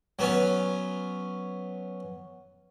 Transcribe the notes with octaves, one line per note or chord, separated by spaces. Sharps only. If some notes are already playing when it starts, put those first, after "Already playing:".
F#3 B3 C#4